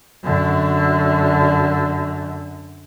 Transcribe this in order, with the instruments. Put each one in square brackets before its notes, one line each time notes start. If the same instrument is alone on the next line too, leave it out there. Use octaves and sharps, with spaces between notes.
[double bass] F#2 D3